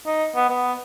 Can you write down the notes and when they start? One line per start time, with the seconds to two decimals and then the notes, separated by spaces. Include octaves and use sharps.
0.06 D#4
0.35 B3
0.49 B3